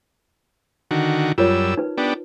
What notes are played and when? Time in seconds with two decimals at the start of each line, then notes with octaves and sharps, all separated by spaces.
0.91 D3 D#3 F#4
1.38 F#2 G3 F4 A#4 C#5 E6
1.77 D#4 B4
1.98 B3 D4 G4